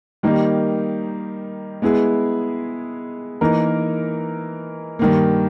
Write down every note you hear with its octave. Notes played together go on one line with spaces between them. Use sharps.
D#3 G3 A#3 D#4
G#3 B3 E4 G#4
E3 A#3 D#4 A#4
G2 D#3 A#3